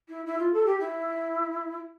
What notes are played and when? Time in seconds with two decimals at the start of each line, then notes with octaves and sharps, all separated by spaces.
0.09 E4
0.26 E4
0.39 F4
0.53 A4
0.66 G4
0.80 E4